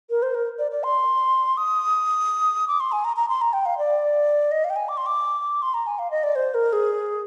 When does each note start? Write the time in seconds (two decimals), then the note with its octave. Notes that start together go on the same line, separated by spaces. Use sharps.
0.10 A#4
0.23 C5
0.35 A#4
0.59 D5
0.71 D5
0.84 C6
1.57 D#6
2.68 D6
2.80 C6
2.92 G#5
3.05 A#5
3.16 A#5
3.29 C6
3.41 A#5
3.53 G5
3.66 F5
3.78 D5
4.51 D#5
4.64 F5
4.70 G5
4.76 G#5
4.89 D6
4.97 C6
5.06 D6
5.62 C6
5.74 A#5
5.87 G#5
5.99 F5
6.11 D#5
6.23 D5
6.35 C5
6.54 A#4
6.73 G#4